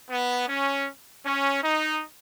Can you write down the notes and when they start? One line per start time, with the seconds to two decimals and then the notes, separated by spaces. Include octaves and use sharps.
0.10 B3
0.47 C#4
1.24 C#4
1.63 D#4